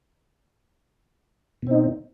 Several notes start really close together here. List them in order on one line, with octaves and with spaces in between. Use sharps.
B2 C4 D#4